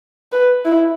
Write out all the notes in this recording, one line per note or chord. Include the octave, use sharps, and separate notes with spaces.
B4
E4